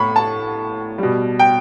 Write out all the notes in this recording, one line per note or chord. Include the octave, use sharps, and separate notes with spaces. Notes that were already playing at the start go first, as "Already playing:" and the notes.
Already playing: A2 B5 C#6
A5
B2 G3
G5